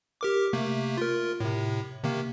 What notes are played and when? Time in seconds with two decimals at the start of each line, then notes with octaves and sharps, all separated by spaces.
0.21 G4 A#4 D6
0.53 C3 A3 A#3
0.97 F4 A#4
1.40 A2 C3
2.04 C3 D#3 A#3